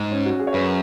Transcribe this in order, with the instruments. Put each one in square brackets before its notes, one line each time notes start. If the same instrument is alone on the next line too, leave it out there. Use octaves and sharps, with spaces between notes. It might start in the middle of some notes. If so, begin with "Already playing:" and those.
Already playing: [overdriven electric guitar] G#2
[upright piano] C#4
F#4
G#4
C#5
[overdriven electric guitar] F#2 [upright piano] B4